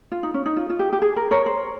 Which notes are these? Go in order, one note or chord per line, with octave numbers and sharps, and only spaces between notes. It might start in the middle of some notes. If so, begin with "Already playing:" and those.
F4
D#4
C#4
D#4
F4
F4
G4
G4
G#4
A#4
A#4 C#5
C5